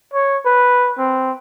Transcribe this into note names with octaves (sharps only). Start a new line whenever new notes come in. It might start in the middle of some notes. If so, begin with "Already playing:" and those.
C#5
B4
C4